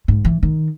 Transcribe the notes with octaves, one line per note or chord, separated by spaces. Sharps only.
G#2
E3
D#3